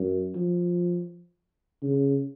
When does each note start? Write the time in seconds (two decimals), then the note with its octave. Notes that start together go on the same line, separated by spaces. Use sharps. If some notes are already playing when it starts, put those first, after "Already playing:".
Already playing: F#2
0.35 F3
1.83 C#3